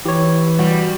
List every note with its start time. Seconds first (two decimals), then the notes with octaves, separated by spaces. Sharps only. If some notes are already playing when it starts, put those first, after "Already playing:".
0.05 E3 G4 C#5
0.59 G3 F#4